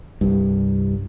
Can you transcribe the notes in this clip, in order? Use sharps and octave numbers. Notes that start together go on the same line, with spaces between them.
C2 G2